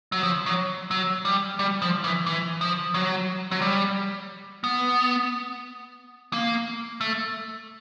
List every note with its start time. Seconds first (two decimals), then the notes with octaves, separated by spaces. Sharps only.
0.12 F#3
0.23 F3
0.46 F#3
0.91 F#3
1.25 G3
1.59 G3
1.82 F3
2.04 E3
2.26 E3
2.61 F3
2.94 F#3
3.51 F#3
3.61 G3
4.64 B3
6.33 A#3
7.01 A3